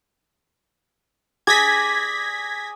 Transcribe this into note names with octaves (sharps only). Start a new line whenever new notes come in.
G#4 D5 G#6 A#6 B6